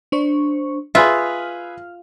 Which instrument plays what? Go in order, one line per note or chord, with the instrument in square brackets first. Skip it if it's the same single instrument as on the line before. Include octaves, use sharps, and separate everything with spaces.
[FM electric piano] D4 C5 C#6
[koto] F4 [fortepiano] G#4 B4 E5 [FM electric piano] F6